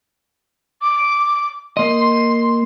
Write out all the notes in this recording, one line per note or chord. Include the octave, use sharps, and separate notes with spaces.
D6
A#3 D#5 C6